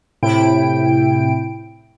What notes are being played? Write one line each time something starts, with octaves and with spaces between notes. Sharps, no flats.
A2 C3 E4 G5 D7